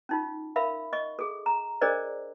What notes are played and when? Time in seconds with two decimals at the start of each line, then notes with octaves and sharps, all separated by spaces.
0.09 C#4 D#4 F4
0.56 A#4 E5 F5 B5
0.93 D#5 C#6
1.19 G#4 A4
1.46 A#5
1.81 D4 G#4 A#4 C5 D5 D#5